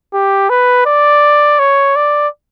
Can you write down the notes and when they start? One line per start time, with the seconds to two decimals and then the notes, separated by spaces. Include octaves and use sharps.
0.14 G4
0.50 B4
0.86 D5
1.59 C#5
1.96 D5